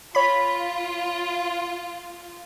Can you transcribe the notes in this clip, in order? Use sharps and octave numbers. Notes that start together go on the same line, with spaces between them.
F4 C#5 B5